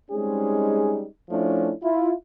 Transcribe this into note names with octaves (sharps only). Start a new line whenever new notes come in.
G3 G#3 C4 C#4 D#4 G#4
F3 A3 C#4 D4 E4
E4 F4